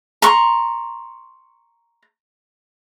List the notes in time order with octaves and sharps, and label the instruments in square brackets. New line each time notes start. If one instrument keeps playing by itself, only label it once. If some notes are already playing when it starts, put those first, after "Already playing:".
[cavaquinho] A#5 C6 C#6